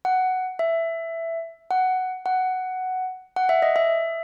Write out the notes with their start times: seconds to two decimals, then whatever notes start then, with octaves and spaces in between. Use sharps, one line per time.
0.05 F#5
0.59 E5
1.71 F#5
2.26 F#5
3.37 F#5
3.49 E5
3.62 D#5
3.76 E5